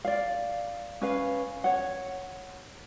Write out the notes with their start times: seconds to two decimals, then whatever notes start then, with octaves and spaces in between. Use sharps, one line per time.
0.05 D5 F5
1.01 C#4 B4 F5
1.64 C#5 F#5